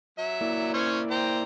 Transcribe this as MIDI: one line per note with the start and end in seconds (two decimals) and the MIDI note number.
0.18 0.71 54
0.18 0.71 76
0.41 1.44 58
0.41 1.44 64
0.41 1.44 74
0.74 1.00 61
0.74 1.00 72
0.74 1.00 73
1.11 1.43 72
1.11 1.43 79
1.11 1.43 82